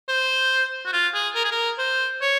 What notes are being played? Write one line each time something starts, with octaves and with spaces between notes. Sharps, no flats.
C5
F#4
F4
G#4
A#4
G#4
A#4
C5
C#5